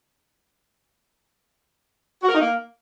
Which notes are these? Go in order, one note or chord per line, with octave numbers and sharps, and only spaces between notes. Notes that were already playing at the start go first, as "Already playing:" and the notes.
F#4
A#4
D#4
A#3